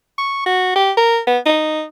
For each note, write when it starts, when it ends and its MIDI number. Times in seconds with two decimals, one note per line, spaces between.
0.18 0.44 85
0.46 0.74 66
0.76 0.91 67
0.97 1.19 70
1.27 1.39 59
1.46 1.83 63